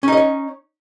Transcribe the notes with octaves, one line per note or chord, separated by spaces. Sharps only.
C#4 D#4 C#5 D#5